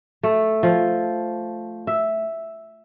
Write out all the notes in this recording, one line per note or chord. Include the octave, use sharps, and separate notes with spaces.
A3
F3
E5